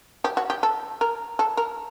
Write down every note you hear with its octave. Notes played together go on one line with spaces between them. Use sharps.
G4
F#4
G4
A4
A#4
A4
A#4